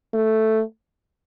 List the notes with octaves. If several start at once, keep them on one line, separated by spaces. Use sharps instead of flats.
A3